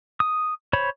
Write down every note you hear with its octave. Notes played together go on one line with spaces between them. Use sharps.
D#6
C5 C#5 B5